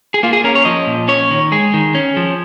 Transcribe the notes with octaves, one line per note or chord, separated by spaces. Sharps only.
G#4
A#3 F4
G#4
C#4 A#4
C#5
F3 D#5
A#2
C#4 C#5
D#3
G#3 G#4
D#3
C#4
F3